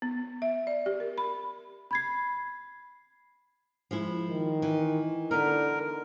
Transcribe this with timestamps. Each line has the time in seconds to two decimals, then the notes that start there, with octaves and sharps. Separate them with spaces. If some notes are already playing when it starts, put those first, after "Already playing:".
0.02 B3
0.42 E5
0.67 D5
0.86 G4
1.00 A#4
1.18 B5
1.91 B5 G#6 C7
3.91 F3 G#3 E4
4.29 D#3
4.62 E3
5.31 D3 B3 D#4 A#4